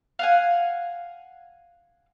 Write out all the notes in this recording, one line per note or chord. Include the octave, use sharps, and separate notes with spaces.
F5 F#5 G#5